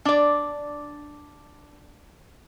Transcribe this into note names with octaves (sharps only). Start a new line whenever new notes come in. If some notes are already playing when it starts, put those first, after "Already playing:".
D4 D5